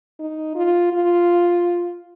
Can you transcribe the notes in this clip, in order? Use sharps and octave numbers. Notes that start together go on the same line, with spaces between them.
D#4
F4
F4